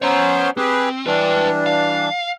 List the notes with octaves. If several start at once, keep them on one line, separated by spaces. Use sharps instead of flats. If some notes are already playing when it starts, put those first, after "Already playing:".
B3 C#4 C5 C#5 A#5
C4 G4 G#4 B4
E3 G3 D4 B4 G5
F5